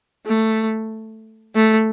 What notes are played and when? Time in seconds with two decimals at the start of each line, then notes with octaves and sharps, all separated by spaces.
0.26 A3
1.55 A3